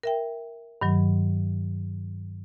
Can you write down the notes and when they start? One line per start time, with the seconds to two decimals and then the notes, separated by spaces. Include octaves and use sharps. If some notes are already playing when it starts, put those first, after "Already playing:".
0.03 A#4 E5 G5
0.81 G2 D#3 F#3